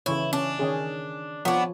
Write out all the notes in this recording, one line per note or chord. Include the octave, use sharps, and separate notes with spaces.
C#3 E3 E4 C#5
C#4 D4
D#3 C#4 G#4
F3 B3 D4 C#5